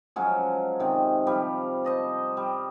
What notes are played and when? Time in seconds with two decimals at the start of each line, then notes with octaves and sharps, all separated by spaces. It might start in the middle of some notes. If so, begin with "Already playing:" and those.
0.16 F3 F#3 G#3 C#4
0.80 C3 D#3
1.27 F3 G3
1.84 C5 D#5 A5
2.37 G3